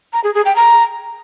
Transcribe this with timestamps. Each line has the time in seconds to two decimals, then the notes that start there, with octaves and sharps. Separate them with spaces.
0.13 A#5
0.24 G#4
0.35 G#4
0.45 G5
0.56 A#5